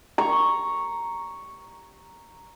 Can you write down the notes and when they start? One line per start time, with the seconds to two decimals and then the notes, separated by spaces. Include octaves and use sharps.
0.18 A#5 C#6